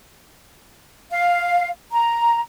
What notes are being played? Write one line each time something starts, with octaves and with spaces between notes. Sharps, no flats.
F5
A#5